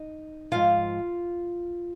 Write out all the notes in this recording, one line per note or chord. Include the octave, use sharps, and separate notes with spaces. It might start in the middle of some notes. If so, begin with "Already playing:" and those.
Already playing: D#4 D#5
G#2 F3 F4 F5